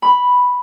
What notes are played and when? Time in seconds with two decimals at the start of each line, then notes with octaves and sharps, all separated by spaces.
0.02 B5